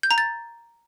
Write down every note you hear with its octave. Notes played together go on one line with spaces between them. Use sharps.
G6
A#5
A6